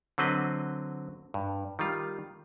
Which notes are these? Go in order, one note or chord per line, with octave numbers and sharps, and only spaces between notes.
D3 F#3 C4 B4 D#5
G2
D#3 G3 F4